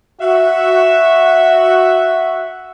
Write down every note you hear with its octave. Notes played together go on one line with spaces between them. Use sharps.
F#4 E5